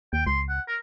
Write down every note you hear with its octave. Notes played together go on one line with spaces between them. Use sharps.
D#2 G5
C#2 C6
F#5
A#4